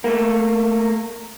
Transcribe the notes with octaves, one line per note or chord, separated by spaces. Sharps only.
A3 A#3